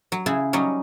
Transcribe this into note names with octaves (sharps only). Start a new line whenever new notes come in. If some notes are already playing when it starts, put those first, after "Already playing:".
F#3
C#3 E4 G#4
F#3 G3 C#4 D#4